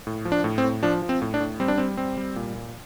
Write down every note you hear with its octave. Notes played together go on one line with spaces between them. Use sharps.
A2
F3
D4
A2
C4
A2
F3 D4
F3
C4
A2
D4
A2
G3 C4
D4
G3 C4
G3 C4
G3
A#2
A#2